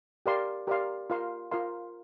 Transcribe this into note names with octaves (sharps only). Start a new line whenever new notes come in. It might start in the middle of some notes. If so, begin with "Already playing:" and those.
G4 A#4 D5 F5 C6
G4 A#4 D5 F5 C6
F4 A#4 F5 C6
F4 A#4 F5 C6